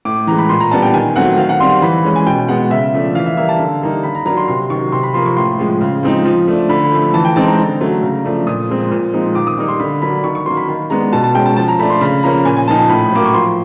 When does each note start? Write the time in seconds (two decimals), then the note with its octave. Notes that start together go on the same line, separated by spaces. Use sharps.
0.05 A2 D6
0.27 E3 G#3 A#5
0.38 B5
0.49 A#2 C6
0.60 A#5
0.71 G3 B3 D4 A5
0.82 G5
0.94 D#3 G#5
1.16 F#3 A3 C4 F#5
1.38 D#3 F5
1.49 F#5
1.60 G3 C4 C6
1.71 C6
1.82 E3 B5
2.05 G#3 C#4
2.16 G#5
2.27 B2 G5
2.48 G#3 B3 F#5
2.71 C#3 E5
2.93 F3 A3 D4
3.15 E3 F5
3.26 E5
3.37 G3 A#3 E5
3.49 A5
3.59 D3
3.82 G3 A#3 D#4
4.03 D#3 B5
4.15 A#5
4.26 F#3 A#3 D4 A#5
4.37 C6
4.48 C3 C6
4.70 D#3 F#3 C#6
4.92 C3 C6
5.03 B5
5.14 F3 A#3 C6
5.26 C#6
5.37 A2 C6
5.59 F3 G#3
5.81 C#3
6.03 F3 G#3 C4 D#4
6.25 F3
6.47 A3 D4
6.69 D3 B5
6.92 F3 A3
7.14 E3 A5
7.25 G5
7.36 G#3 C4 D#4 A5
7.47 A#5
7.58 D3
7.81 F#3 A3
8.03 C#3
8.24 F3 A3 D4
8.47 A#2 D#6
8.69 F3 G#3 C4
8.91 A#2
9.13 F3 G#3 C4 D#4
9.35 D#3 D6
9.47 D#6
9.57 G3 A#3 D#4 D6
9.68 C6
9.80 D3 B5
10.02 F#3 A#3 D4 B5
10.24 D#3 C#6
10.35 C#6
10.46 F#3 A#3 C6
10.57 B5
10.68 D#3
10.90 G#3 B3 D4 A#5
11.13 B2 A5
11.24 A5
11.35 G#3 C#4 G5
11.46 A5
11.57 F3 A5
11.68 A#5
11.79 A3 D4 B5
11.90 C6
12.01 C#3 B5
12.23 F3 A#3 C#4 A#5
12.45 A#2 G#5
12.57 G#5
12.68 F3 A#3 D#4 A5
12.79 A5
12.90 A2 B5
13.12 F#3 A#3 D6
13.25 C#6
13.34 F3 C6